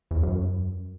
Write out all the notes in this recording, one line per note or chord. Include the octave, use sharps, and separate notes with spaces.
E2
F#2